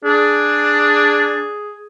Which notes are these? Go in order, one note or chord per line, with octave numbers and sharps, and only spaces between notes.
D4 G#4